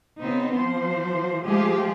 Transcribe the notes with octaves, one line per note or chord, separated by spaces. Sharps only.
C#3 B3 C4 D#4
F3 C5
F3 G#3 A3 F4 G4 G#4